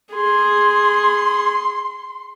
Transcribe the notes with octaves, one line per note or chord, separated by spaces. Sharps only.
G#4 C6